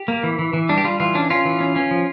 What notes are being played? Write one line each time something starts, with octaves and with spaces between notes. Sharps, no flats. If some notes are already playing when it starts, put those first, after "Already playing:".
Already playing: G4
A#3
E3
E3
E3
G3 D4
G4
G3 F4
E3 F4
C#4 D4
C#4 F4
E3
C#4
C#4
F3